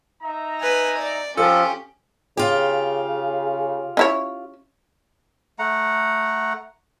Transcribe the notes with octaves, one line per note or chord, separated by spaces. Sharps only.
D#4 E5 A#5
B4 G#5
D5
F3 C#4 G4 A4
C#3 F4 G4
C#4 E4 C#5
A3 F#5 A#5